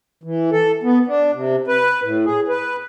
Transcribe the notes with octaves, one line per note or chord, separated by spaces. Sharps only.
E3
A4
B3
D4
C3
B4
A2
G#4
B4